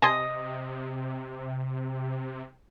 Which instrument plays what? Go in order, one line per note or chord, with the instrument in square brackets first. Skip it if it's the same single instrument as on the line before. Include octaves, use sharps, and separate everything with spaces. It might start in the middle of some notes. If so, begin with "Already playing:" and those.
[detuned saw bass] C3 [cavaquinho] D#5 D#6 [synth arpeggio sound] G#5 A5 C6